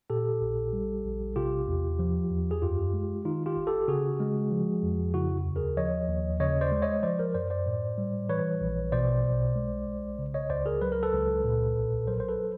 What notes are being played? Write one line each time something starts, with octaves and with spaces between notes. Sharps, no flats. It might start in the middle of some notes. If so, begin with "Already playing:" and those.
A#2 G4 A4
A#1
G3
A#1
C3 F4 G4
E2
F3
E2
G#4
F#2 F4 G4
G#3
D#3 D#4 F4
F4 G4
G1
G4 A4
C#3 F#4 G#4
G#3
F3
F2
C#3 E4 F#4
D#2
G#4 A#4
F3 C#5 D#5
D#2
C#3 C#5 D#5
C5 D5
G#3
C#5 D#5
F3 C5 D5
A#4 C5
F#2 C5 D5
C5 D5
A2
G3
E3 B4 C#5
A#1
B2 C5 D5
B1
G#3
B1
C#3
C#5 D#5
C#2 C5 D5
G#4 A#4
F#3 B4
A#4
A4 B4
C#2
A#2
B1
F#3 A#4 C5
C5
A4 B4